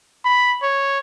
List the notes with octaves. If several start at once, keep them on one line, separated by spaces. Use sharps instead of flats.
B5
C#5